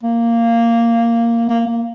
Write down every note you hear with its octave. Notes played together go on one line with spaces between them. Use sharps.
A#3
A#3
A#3